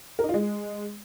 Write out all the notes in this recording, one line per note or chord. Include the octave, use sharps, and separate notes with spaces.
A#4
D#4
F4
G#3